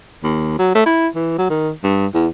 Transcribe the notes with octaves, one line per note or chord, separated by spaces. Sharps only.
D#2
F#3
A3
E4
E3
F#3
D#3
G2
E2